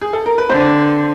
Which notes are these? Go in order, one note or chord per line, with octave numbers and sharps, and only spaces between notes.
G#4
A4
A#4
B4
D3 C4 C5